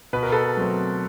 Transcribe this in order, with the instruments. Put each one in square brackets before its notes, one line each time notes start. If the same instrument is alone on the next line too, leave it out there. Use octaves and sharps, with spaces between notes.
[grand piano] B2 B4
A#4
A4 B4
F#3 A3 C4